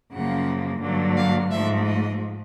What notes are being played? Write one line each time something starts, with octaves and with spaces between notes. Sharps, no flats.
F#2 C#3 F3 A#3 F#5
G2 D3 F#3 A#3
F5
G#2 F3 A3 E5
D#5